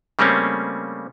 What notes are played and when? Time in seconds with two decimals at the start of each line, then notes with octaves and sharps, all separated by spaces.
0.19 C#3 G3 A3 A#3 C4 C#4